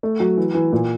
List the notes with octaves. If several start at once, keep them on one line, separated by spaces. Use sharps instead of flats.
A3
F#3
E3
E3
A#2